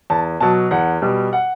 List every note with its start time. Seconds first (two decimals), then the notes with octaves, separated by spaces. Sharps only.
0.10 E2 A5
0.40 B2 F#3 A5
0.71 E2 F#5
1.02 B2 G3
1.33 F#5